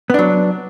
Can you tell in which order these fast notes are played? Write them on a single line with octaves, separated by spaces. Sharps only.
B3 D4 F#3